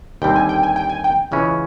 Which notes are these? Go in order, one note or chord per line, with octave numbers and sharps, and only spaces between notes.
D#2 D3 G3 C4 G5
G#5
G5
G#5
G5
G#5
G5
C#2 C#3 E3 G#3 C#4